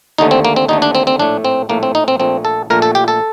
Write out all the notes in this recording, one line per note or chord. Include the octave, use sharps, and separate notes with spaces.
D#2 D3 A3 D#4
C4
A#3
C4
D#2 D3 A3 D#4
D4
C4
C4
A#1 A2 A3 D4
C4
A#1 A2 A3 A#3
C4
D#4
C4
A#1 A#2 A3 C4
A4
A#1 A#2 A3 A#4
A4
G4
A4